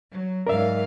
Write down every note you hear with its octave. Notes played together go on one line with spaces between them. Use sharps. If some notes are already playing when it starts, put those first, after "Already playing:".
F#3
G#2 F#3 A#4 D5 E5 F5